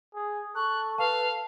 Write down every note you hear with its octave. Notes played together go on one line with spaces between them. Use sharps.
G#4
A4 C#6 F#6
A4 B4 F5 A5